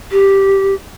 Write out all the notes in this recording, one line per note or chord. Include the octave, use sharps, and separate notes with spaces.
G4